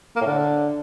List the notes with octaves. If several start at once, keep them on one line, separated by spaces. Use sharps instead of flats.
A#3
A2
D3